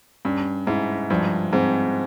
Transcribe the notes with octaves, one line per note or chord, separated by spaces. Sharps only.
G2 C#4
G#2 E4
G2 F3
G#2 C4